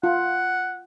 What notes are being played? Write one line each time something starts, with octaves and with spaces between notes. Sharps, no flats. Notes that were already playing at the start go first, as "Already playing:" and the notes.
F4 F#5